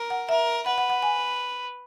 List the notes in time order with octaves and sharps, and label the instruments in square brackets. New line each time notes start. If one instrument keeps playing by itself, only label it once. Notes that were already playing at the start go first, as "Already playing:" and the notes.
Already playing: [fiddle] A#4
[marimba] F#5
[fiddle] A#4 [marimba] E5
[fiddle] B4 [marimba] F#5
[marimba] F#5
F#5
G#5